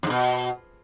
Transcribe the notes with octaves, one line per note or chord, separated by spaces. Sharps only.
F2 G#2 B2